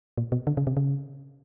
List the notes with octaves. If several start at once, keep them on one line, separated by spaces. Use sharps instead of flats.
A#2
B2
D3
C#3
C3
C#3